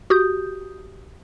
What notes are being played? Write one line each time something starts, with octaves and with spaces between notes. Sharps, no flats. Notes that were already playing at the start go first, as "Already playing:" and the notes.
F#4 G4 D#6 G6